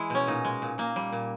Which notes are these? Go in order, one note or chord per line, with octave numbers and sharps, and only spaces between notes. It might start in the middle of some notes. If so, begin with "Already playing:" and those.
Already playing: E3 G#3 E4
B2 C#4
A#2 D#4
G#3
A#2
A#2 A#3
G3
A#2